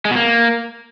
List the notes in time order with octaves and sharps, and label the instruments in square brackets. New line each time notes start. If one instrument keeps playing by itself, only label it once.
[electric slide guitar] G#3
B2
A#3